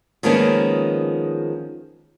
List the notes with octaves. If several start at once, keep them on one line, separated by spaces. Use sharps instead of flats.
D#3 F3 G#3 A#3 B3 C#4